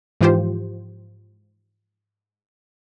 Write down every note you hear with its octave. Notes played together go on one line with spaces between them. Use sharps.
G#2 E3 F3 F4 G4 C5